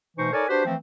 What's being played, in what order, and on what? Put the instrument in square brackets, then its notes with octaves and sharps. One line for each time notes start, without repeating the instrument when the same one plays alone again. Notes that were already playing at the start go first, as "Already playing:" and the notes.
[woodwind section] B2 E3 A3 D#4 C5 C#6
D#4 A4 A#4 C#5 D5 G#5
D4 F#4 G4 B4 C5
E3 F3 A3 C4